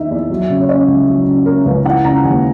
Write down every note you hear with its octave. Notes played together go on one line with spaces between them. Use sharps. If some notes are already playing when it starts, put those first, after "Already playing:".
Already playing: E2 D#3 A#3 D#4 E5
E2
F#3
C#3
C#5
C#4 D#5
C#2
F#3
C#3
C#4 A#4
C#2 B4
E3 F#5
C#3 A#5
D#2 G#5